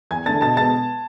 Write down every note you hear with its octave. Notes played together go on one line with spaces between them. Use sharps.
E2 G#5 G#6
D3 A3 A5 A6
B2 A5 A6
G#3 B3 A5 A6